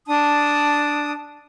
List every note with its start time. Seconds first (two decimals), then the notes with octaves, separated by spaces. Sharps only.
0.07 D4 A5 D#6